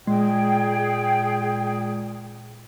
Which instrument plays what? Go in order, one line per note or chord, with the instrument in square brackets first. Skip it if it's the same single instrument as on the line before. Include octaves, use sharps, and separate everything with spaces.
[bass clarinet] A#2 [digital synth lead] G#3 [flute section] G#4 G5